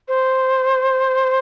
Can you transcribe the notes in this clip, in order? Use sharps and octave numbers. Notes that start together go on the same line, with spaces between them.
C5